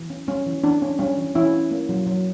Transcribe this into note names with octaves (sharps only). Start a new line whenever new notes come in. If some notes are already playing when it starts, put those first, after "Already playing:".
Already playing: E3
C#4
G3 C#4
E3
E3 D4
C#4
G3 C#4
E3
E3 C#4 E4
C#4
A#3
F#3
F#3